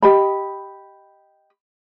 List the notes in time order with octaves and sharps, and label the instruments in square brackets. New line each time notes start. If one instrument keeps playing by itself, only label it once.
[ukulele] G4 D#5 B5